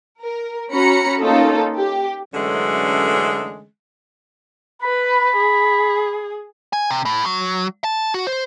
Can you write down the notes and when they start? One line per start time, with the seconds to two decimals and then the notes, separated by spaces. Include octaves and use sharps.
0.23 A#4
0.72 C#4 F#4 A#5 B5 C#7
1.20 A#3 C#4 D#4 F4 A4
1.77 G4
2.34 F#2 D3 E3 G#3 A3 C#4
4.82 B4 B5
5.37 G#4
6.73 G#5
6.91 C3
7.05 A2
7.26 F#3
7.84 A5
8.14 F#4
8.27 C5